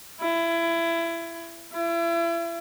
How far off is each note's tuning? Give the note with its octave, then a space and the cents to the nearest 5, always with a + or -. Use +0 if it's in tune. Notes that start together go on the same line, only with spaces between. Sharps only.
E4 +25
E4 +35